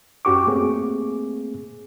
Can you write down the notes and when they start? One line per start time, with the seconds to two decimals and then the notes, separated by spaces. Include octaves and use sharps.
0.25 F#2 C#4 F#4 G4 C#6 D6
0.47 A3 A#3 C4 G#4